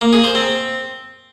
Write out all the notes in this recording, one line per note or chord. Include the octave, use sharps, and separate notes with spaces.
A#3
G#4
C5
C4